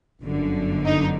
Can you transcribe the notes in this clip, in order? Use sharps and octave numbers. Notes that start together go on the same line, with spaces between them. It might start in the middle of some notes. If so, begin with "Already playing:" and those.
G1 F#2 D3
D#4